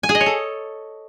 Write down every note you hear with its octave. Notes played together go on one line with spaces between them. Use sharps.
G#5
G#4
D#5
C#5
A4